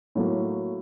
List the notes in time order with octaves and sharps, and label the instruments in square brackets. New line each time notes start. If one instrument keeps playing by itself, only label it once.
[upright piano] A2 F#3 A#3